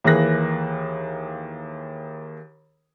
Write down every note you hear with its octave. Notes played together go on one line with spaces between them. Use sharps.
D#2 E3 A#3 G#4 F#6 A#6